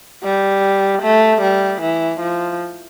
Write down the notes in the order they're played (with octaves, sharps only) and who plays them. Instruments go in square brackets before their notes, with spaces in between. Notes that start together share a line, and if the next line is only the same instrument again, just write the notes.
[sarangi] G3
A3
G3
E3
F3